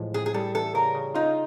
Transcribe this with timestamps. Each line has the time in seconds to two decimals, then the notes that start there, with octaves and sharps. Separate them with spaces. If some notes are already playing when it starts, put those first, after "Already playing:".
Already playing: A2 E3 F3 G#3
0.14 A2 G#4
0.26 G#4
0.34 G3 A4
0.55 E3 A4
0.74 C#3 A#4
0.95 C#3
1.14 D#4 F4